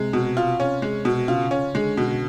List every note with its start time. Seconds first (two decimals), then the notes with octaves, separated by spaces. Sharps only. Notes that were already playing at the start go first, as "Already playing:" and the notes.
Already playing: C3 G#3
0.13 B2
0.37 F4
0.60 C#4
0.82 G#3
1.05 B2
1.28 C#3 F4
1.51 C#4
1.75 D3 G#3
1.97 B2